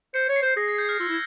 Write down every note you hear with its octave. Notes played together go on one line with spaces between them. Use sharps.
C5 C#7
C#5
C7
C5
G#4 A#6
G#6
G6
F6
F4 E6
E4